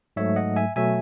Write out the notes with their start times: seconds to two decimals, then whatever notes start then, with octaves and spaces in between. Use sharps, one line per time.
0.16 G#2 F#3 A3 C#5 E5
0.36 D#5 F#5
0.56 E5 G#5
0.76 B2 F#3 A3 E5 G#5